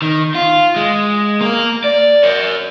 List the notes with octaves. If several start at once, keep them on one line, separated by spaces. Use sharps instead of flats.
D#3
F4
G#3
A#3 A#4
D5
A#4 C#5